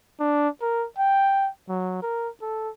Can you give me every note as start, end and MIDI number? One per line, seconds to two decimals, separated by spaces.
0.20 0.49 62
0.62 0.86 70
0.98 1.49 79
1.69 2.02 54
2.02 2.29 70
2.42 2.70 69